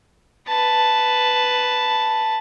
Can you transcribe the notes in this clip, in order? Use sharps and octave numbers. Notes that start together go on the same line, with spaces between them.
B4 A5